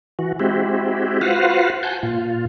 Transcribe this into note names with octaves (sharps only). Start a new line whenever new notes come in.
E3 F#4
G#3 C4 E4 F#4 G4
F4 F#4 B4 C5 F5 F#5
F#5 G#5 A5 G6
A#2 F4